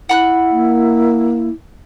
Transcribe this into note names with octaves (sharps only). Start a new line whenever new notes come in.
E4 F#5 B5 F#6
A#3